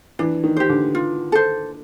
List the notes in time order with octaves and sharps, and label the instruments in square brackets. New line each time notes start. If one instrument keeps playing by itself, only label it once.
[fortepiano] E3 [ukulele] D4
[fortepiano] D#3
[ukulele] G4 C5
[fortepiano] D3
[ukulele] F4
A4 C5